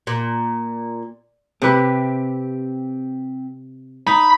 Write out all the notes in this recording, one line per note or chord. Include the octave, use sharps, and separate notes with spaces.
A#2
C3 C4 G4 B4
D#4 B5